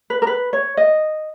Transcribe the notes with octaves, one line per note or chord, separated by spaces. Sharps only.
B4
A#4
B4
C#5
D#5